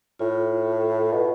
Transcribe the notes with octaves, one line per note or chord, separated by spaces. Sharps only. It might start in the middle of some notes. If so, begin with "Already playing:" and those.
A2 F4
B2